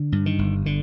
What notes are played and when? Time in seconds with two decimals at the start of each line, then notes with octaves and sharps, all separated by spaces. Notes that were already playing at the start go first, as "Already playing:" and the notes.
Already playing: D3
0.12 G2
0.26 D#3
0.39 G1
0.66 D3